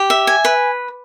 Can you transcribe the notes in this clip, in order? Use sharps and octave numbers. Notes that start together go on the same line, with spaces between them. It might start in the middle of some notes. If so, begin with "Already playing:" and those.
Already playing: G4
E5
G#5
B4